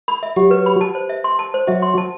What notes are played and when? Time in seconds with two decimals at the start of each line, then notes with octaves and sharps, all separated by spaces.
0.08 B5
0.23 E5
0.36 F#3 F#4 G4
0.51 B4
0.66 B5
0.81 A5
0.95 C5
1.09 E5
1.24 C6
1.39 A5
1.54 C5
1.67 F#3 F#4 E5
1.82 C6
1.98 A5